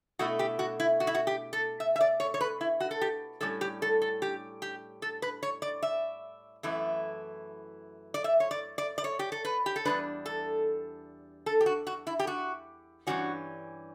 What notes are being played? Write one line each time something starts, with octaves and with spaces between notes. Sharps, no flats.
B2 A3 E4 F#4
G4
F#4
E4
F#4
E4
F#4
G4
A4
E5
E5
D5
C#5
C#5
B4
E4
F#4
A4
G4
A2 G3 C#4 A4
G4
A4
A4
G4
G4
A4
B4
C#5
D5
E5
F#2 E3 A3 E4
D5
E5
C#5
D5
D5
D5
C#5
G4
A4
B4
G4
A4
E2 B2 G3 D4 B4
A4
A4
G4
F#4
F#4
E4
G4
F#4
G2 E3 G3 C#4 F#4